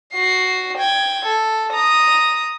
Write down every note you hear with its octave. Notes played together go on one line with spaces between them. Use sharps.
F#4 C7
G5 G#6
A4
A#5 D#6